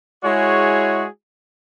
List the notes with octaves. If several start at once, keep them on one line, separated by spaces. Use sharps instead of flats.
G#3 E4 F#4 G#4 C#5